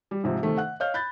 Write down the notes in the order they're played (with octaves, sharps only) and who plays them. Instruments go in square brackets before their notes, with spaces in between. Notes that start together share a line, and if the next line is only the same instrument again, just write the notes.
[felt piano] G3
G#2 C3 F3
C3 D#3 A3
F#5 F#6
C#5 D#5 F5 F6 G6
B5 F#6 G6 A6